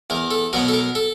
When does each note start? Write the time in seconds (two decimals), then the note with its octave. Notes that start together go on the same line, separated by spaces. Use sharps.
0.10 E2 A#4
0.31 A4
0.53 B2 F#3 B3 A#4
0.68 A4
0.74 A#4
0.95 A4